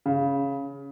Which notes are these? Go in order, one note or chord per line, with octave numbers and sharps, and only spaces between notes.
C#3